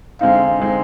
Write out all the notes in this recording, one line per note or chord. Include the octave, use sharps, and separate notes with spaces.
D3 G#3 C4 D#4 F5
D3 G#3 C4 D#4